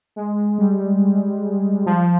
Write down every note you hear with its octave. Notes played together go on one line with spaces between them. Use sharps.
G#3
G3
F3